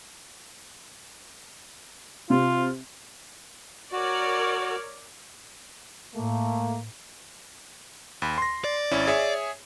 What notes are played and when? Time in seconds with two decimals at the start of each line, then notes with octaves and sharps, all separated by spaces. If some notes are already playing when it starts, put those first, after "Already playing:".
2.30 C3 F4
3.92 F#4 A#4 C#5 D5
6.15 A2 A3 A#3
8.22 D#2 B5
8.38 C6 A#6
8.64 D5
8.91 G#1 C#4 E4
9.07 G#4 C#5 E5